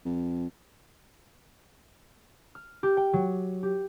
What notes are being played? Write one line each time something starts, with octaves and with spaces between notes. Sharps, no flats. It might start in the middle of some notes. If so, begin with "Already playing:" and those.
F2
F6
G4
G5
F#3
G4